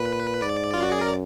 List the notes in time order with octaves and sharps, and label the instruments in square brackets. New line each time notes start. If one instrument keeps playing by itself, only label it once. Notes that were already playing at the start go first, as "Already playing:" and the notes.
Already playing: [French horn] A#2 [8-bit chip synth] B4
[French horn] G#2 [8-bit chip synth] D5
[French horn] F#2 [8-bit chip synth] F4
[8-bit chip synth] F#4
G#4
A#4